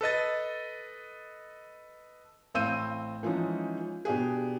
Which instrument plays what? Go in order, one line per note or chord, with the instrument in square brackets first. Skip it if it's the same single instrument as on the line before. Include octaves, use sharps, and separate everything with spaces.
[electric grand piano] A4 B4 D#5 A6
[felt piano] A1 C4 F5 E6 G6 D#7
E3 F3 G#3 C#4 D#4
B2 D4 G4 G#4